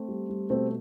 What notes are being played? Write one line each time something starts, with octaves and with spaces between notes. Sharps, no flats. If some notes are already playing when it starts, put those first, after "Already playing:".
Already playing: A3 C4
G3
G3
B2 A3 C4